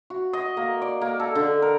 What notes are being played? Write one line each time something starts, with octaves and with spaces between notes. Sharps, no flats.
F#4
D#5
A#3
D5
A#3
A4
D3
A#4